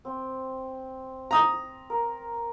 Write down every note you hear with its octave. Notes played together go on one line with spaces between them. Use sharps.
C4
A#5 D#6
A#4